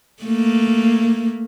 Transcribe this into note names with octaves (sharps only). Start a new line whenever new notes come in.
A3 A#3